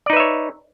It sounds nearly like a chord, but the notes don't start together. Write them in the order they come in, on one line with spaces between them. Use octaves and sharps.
D5 D#4 B4 E5 C#5